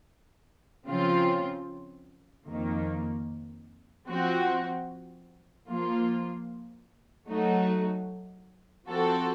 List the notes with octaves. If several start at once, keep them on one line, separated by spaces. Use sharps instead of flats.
C#3 F3 C4 F4
F2 D#3 A#3
F3 C4 F#4
F3 A#3 F4
F#3 A3 D#4 F#4
F3 C4 F#4 A4